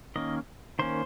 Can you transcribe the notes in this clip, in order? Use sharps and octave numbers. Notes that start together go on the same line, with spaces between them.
D#3 A#3 C#4 D#5
D#3 A#3 C#4 C5